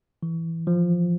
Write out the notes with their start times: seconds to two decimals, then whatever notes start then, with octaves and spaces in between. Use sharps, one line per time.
0.23 E3
0.67 F3